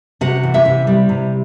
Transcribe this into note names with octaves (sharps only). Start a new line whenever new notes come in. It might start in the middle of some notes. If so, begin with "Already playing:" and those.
C3 F#4 F#5
E3
E4 E5
C3
G3
C3